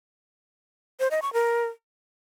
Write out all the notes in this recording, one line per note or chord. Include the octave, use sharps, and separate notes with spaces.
C5
D#5
C#6
A#4